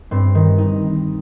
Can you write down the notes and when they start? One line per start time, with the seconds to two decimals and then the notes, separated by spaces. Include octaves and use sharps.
0.11 G2 C4
0.35 D#3
0.58 D#4